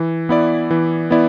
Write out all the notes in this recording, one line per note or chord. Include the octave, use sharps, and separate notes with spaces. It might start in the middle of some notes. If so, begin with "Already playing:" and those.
Already playing: E3
B3 E4 D5
E3
B3 E4 D5